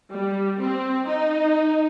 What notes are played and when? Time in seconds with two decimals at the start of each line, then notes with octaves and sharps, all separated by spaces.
0.13 G3
0.60 C4
1.08 D#4